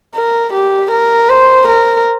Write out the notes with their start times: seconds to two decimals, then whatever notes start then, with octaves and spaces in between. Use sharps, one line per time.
0.15 A#4
0.53 G4
0.91 A#4
1.29 C5
1.67 A#4